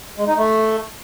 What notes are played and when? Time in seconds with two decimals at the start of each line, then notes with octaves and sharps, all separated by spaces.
0.18 G#3
0.28 D#4
0.37 A3